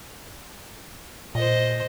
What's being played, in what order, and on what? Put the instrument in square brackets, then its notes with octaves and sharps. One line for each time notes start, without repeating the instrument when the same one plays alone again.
[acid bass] A#2 [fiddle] C5 D#5